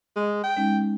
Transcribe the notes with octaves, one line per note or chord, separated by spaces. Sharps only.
G#3
G5
G#3 C#4 D#4